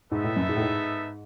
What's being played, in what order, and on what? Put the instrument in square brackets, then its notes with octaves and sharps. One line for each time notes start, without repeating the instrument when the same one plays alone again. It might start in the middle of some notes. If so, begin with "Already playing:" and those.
[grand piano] G#2 [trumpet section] B3 D#4 A4 E5
[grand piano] A2
F#2
G#2
A2
G#2